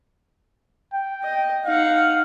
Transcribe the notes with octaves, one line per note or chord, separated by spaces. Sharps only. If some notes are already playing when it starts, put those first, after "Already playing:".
G5
D#5
D#4 F5 F#5